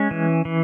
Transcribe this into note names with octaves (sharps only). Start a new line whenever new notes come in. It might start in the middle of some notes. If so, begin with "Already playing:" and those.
Already playing: G#3 C#4
E3
E3